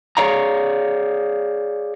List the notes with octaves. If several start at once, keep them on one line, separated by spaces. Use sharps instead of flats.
G#4 A4 C#5 D5 F5 A#5